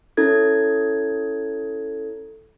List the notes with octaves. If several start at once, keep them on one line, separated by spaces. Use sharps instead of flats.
C#4 E4 A4 G#6